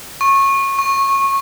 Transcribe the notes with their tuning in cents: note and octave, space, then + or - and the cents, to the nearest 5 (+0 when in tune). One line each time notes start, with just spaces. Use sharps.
C#6 -20
C#6 -5